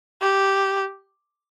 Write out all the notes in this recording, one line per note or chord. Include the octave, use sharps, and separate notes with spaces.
G4